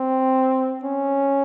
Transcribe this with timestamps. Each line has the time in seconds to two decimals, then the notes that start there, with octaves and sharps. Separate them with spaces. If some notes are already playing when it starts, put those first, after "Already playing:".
Already playing: C4
0.84 C#4